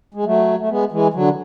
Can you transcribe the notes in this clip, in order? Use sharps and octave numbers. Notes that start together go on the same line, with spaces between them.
G#3
F#3 A3
A3
G#3 B3
E3 G#3
D3 F#3